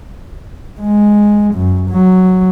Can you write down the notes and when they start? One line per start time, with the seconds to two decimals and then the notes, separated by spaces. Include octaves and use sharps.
0.81 G#3
1.55 F#2
1.90 F#3